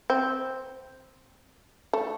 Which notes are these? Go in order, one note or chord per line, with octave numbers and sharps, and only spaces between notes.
C4
A3